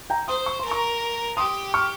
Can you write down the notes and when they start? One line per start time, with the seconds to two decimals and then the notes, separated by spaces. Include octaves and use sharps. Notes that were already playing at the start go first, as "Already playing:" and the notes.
0.10 G5 A#5
0.28 C5 C6 D#6
0.46 C#6
0.59 C6
0.65 A#4
0.71 A#5 C#6
1.37 G4 C6 D#6
1.74 C#6 F6